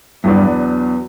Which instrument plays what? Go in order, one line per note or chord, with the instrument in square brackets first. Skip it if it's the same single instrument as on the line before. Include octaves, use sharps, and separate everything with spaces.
[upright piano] E2 B2 F#3 B3 D4 [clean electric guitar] G2